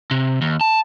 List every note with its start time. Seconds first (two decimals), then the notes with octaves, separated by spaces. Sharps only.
0.11 C3
0.41 D#2
0.61 A5